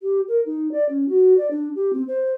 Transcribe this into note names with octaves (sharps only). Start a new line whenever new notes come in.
G4
A#4
D#4
D5
C#4
F#4
D5
D4
G4
C4
C5